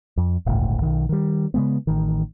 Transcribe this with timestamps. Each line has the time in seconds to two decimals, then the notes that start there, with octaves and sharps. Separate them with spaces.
0.17 F2
0.46 D1 G1 C#2 A2
0.82 B1 D#3
1.09 D#3 G3
1.54 C#3 G#3 B3
1.87 A1 D#3